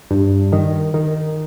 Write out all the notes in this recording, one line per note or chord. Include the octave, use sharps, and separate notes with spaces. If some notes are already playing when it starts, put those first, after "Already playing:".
G2
D#3
D#3